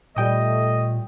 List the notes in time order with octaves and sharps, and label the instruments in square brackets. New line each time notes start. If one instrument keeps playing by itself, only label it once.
[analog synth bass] A#2 [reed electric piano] G3 G5 D#6 [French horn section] A3 [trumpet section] D#5